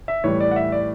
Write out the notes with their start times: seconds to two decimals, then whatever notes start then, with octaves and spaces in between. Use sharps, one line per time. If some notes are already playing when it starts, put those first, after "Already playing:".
0.08 E5
0.24 A2 E3 G3 C#5
0.41 D5
0.51 F#5
0.56 E5
0.72 D5